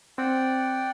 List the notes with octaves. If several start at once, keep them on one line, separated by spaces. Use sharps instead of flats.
C4 D5 F#5 G5